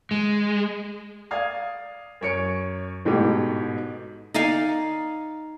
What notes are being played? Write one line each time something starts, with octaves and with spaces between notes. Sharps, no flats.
G#3
D5 F5 D#6 G#6
F#2 C#5 C#7 D7
A1 G#2 B2 A3 G4
D#4 D5 F5 G#5